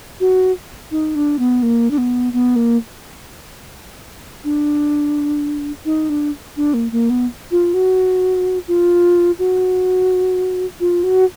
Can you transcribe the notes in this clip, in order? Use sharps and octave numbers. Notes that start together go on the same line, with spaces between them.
F#4
D#4
D4
B3
A#3
D4
B3
B3
A#3
D4
D#4
D4
D4
A#3
A#3
B3
F4
F#4
F4
F#4
F4
F#4